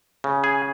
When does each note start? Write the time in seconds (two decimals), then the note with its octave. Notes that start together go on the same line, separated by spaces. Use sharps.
0.24 C#3
0.44 G#4